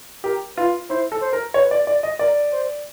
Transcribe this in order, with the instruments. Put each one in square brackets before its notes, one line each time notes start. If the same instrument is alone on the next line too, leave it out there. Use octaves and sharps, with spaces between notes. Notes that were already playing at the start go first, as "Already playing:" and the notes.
[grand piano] G4 [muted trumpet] A#4
[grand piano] F4 [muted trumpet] B4
[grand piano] E4 [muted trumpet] C5
[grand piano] A4
[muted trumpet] C5
[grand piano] A#4
[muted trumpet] B4 [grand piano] C#5
[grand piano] D5
D5
D#5
[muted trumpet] A#4 [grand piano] D5
[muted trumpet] C5